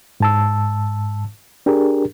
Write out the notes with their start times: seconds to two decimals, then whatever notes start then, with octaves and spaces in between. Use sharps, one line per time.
0.20 G#2 A5 E6
1.66 D4 G4 G#4 A#4